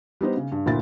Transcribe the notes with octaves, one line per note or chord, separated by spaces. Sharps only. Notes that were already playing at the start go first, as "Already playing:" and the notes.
G3 B3 D#4 C5
C#3
G2
D2 A#2 E4 A6